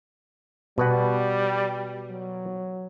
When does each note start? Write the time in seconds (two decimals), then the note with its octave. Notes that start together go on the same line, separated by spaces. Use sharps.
0.78 B2 G3 B4 F#5
2.10 F#3